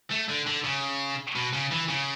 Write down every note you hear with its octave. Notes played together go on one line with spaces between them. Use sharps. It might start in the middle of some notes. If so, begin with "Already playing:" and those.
A3
D3
D3
C#3
B2
C#3
E3
C#3